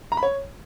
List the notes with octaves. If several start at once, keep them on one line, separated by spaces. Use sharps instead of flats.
A#5
B5
C#5